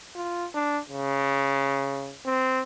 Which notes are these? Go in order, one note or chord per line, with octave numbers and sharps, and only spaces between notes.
F4
D4
C#3
C4